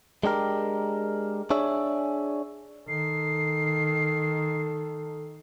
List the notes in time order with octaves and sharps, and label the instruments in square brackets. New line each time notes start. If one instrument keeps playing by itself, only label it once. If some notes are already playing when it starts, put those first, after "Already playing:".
[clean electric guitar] G#3 D4 G4 A#4
D4 G#4 C#5 E5
[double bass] D#3 [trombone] A4 [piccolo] C7